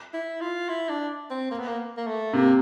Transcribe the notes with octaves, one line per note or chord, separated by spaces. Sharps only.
E4
F4
E4
D4
C4
A#3
B3
A#3
A#3
A3
C3 A#3